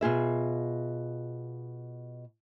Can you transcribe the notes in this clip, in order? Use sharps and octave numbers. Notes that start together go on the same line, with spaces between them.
B2 F4 G#4 E5